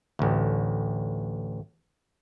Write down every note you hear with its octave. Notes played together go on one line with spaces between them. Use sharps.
A1 D2